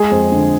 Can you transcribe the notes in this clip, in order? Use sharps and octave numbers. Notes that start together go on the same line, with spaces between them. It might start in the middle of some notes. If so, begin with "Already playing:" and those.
Already playing: G#3 G#4
F2
D3